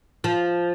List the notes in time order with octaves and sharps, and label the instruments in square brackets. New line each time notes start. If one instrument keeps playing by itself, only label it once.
[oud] F3